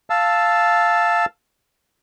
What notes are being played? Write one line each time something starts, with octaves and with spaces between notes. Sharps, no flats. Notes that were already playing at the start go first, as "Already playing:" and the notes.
F5 A5 E6